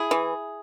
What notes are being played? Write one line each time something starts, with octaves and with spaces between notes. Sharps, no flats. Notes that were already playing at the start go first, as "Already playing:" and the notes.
Already playing: E4 G#4
E3